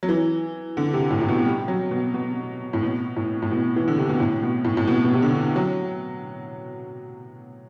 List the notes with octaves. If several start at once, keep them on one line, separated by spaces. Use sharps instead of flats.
F#3
E3
D3
C3
A2
A2
B2
G3
F#3
B2
B2
A2
B2
A2
A2
B2
E3
D3
C3
B2
A2
B2
A2
A2
B2
B2
C3
D3
F#3